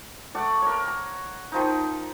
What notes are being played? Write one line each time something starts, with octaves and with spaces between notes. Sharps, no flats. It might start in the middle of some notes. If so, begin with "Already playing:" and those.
A3 D5 F#5
A#4 C#5
A#5
D#3 F3 D#4